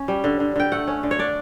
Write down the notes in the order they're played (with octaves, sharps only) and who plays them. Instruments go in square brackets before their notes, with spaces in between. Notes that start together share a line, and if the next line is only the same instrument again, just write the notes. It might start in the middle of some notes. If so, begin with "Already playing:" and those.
Already playing: [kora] C#4
G3
D3
D3
D3 G5
A3 F#5
C#4
D3
C#5
D4 D5